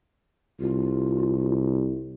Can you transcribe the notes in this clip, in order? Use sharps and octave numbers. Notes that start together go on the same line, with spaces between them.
C2 F4